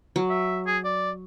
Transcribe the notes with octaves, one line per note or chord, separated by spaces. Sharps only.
F#3
E5
G#4
D5